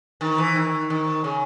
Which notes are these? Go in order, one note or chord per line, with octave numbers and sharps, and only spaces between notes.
D#3
E3
D#3
D#3
C#3